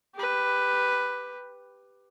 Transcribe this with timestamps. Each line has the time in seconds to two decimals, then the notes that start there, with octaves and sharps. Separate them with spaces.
0.15 G4 B4